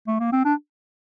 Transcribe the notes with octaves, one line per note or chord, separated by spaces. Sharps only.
A3
A#3
C4
D4